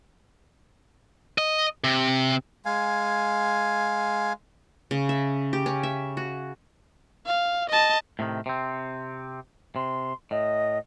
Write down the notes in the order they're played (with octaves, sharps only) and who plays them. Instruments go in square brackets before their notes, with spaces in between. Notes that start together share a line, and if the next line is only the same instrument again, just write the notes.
[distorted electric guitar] D#5
C3
[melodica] G#3 F5 G#5
[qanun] C#3
E5
G4
C#4
E5
F#4
[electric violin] F5
D#5 A5
[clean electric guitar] A2 C3 D#3
C3 C4
[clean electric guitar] C3 [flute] C6
[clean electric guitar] A2 [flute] D#5